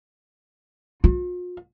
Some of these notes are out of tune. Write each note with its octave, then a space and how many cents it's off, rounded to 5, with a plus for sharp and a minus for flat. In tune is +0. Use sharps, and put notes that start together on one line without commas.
F4 +45